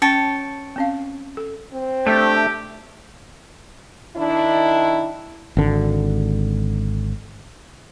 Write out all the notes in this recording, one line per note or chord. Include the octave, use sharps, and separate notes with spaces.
C#4 C#5 G5 A5
C4 C#4 F5
A4
C4
A3 D4 G4 E5
D#3 D4 E4
G#1 D3